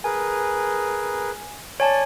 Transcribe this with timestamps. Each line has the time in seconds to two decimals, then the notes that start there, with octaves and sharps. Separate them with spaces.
0.04 G#4 A#4 B4 G#5
1.80 C#5 D5 G#5 A5 C#6